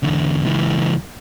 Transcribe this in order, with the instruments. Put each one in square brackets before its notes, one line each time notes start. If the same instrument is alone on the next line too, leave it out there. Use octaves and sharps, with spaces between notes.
[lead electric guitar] E2 D3
C#2 E3